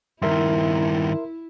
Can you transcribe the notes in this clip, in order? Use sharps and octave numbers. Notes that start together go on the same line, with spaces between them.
G2 D#3 E4 A#4 E5 C6